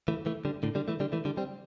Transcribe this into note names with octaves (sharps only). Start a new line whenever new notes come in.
E3 A3
E3 A3
D3 G3
A2 D3
D3 G3
E3 A3
D3 G3
E3 A3
D3 G3
G3 C4